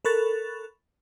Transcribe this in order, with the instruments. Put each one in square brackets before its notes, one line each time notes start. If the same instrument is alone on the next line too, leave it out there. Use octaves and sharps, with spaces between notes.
[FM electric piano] A4 A#4 B5 C#6 F#6 A6